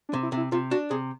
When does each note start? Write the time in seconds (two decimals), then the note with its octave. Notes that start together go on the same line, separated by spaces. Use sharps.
0.09 D4
0.13 C3
0.23 E4
0.32 C3
0.37 E4
0.52 C3 F4
0.71 D4 F#4
0.90 C3 G#4